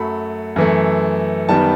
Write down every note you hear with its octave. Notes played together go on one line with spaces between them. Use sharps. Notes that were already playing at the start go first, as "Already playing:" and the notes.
Already playing: F#2 F#3 A3 B5
F#2 E3 A3
F#2 D#3 G3 B3 A5